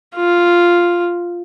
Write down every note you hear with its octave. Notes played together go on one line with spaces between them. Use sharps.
F4